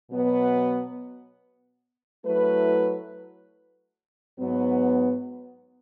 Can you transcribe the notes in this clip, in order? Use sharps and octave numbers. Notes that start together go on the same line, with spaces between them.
B2 F#3 B3
F#3 A3 E4 B4
G#2 F#3 B3